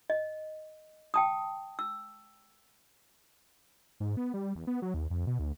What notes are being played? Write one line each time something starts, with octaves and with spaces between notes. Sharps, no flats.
D#5
G5 A5 D#6
E6
G#2
B3
G3
E2
B3
F#3
D#2
F2
B2
D2